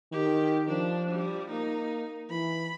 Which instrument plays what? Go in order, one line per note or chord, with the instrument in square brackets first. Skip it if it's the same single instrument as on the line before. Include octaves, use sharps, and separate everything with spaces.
[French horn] D#3 [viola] G4
[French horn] F3 [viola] D4
[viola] G3
[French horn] A#3 [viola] D#4
[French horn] E3 [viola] B5